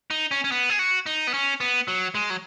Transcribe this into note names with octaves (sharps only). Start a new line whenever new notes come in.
D#4
C#4
C#4
B3
G#4
F#4
D#4
B3
C#4
B3
F#3
G#3
F#3